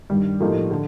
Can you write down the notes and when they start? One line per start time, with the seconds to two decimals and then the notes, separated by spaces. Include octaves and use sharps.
0.10 G2 D#3 G3
0.40 A2 F3 A#3 D#4 G4
0.71 D3